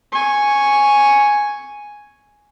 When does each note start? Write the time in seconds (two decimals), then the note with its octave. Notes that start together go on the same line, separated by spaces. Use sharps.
0.12 G#5 C#6